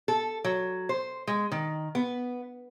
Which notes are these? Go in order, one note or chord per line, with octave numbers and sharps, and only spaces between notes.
A4
F#3
C5
G#3
D#3
B3